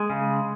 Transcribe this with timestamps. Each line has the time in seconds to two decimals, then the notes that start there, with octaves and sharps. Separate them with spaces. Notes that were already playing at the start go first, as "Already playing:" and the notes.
Already playing: G#3
0.10 C#3